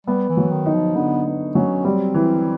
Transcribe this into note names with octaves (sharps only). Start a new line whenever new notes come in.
G3 B3
E3
F#3
D#3
D#4
F3
D3 B3
B3
F#3 C#4
G3 C4
E3